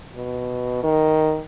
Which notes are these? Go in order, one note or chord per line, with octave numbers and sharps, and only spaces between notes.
B2
D#3